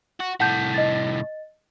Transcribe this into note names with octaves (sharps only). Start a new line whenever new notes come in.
F#4
C2 A2 F#5 A5 G6
D#5 A6